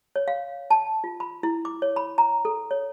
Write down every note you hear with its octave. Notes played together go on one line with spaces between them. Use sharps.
C#5
F5
A5
F4
B5
E4
D6
C#5
B5
A#5
A4
C#5